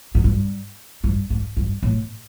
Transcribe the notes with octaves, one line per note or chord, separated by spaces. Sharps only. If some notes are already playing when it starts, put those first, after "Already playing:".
G#2
G2
G2
G#2
G2
A2